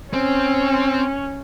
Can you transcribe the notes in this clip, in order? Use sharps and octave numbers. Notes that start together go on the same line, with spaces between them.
C4 C#4